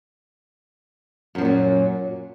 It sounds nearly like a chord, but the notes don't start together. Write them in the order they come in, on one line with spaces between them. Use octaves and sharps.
F#2 F3 A#2 F#3